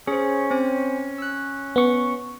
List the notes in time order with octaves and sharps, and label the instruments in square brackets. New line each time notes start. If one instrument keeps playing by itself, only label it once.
[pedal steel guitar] C#4 [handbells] G#4 C5
[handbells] C4 C5 G#5
E6 F#6
[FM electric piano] B3 C#6